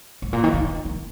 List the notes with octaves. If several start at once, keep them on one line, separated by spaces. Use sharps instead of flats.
G#2
A#2
D#3
D#3
D#3